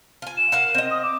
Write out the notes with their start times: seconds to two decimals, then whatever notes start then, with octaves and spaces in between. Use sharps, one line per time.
0.22 F4 G#5
0.37 E7
0.52 A#4 F5 F#5
0.74 C4 D#5
0.91 D#6
1.03 D6